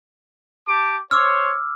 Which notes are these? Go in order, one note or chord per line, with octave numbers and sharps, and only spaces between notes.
G4 A5 D6
C5 C#5 D6 E6 F6